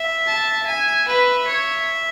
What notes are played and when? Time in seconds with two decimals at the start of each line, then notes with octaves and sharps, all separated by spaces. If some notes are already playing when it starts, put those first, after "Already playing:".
Already playing: E5
0.27 A5
0.67 E5 G#5
1.08 B4
1.48 C#5